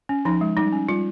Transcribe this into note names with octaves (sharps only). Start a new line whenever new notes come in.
C#4
F3 D#4
G#3
G3 D#4
C#4
G3 F4